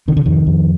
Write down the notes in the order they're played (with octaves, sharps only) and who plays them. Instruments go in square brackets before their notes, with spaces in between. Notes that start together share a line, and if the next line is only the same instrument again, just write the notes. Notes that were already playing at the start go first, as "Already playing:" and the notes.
[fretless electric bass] C3 D#3
D3
F2 D#3
F2